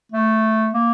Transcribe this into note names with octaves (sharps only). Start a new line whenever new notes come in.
A3
A#3